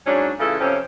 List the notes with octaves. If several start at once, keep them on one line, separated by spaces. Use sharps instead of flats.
G#2 F#3 C#4 D4
C#3 E3 A3 F4 A4
F2 C3 C4 C#4